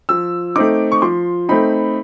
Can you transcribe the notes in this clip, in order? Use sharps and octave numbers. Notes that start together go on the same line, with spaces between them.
F3 E6
A3 C4 D#4 D6
C#6
F3 C6
A3 C4 D#4 B5